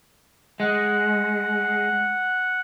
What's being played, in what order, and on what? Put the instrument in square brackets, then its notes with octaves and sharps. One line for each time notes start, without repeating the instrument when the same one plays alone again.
[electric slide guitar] G#3 [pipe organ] F#5